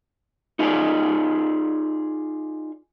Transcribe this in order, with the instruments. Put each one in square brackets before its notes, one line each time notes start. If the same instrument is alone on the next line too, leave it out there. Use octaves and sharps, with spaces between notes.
[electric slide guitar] D#4 F4 G#4 A#4 C#5 D5